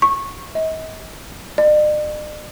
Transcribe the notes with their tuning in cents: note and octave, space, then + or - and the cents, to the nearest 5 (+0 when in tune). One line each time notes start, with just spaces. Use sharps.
C#6 -20
D#5 +40
D5 +45